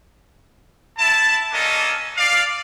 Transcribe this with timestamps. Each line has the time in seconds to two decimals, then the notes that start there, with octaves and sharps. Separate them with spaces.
0.98 E4 A5
1.52 A#3 C#4 D4 A4 D#5
2.17 D5 F5